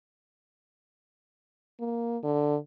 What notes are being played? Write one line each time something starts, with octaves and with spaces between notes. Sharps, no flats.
A#3
D3